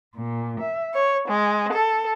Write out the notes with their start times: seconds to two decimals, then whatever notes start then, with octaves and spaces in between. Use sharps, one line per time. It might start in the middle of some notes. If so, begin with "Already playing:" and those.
0.17 A#2
0.61 E5
0.94 C#5
1.27 G#3
1.71 A4